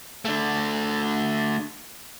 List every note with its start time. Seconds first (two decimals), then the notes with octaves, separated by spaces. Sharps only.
0.25 A3 D4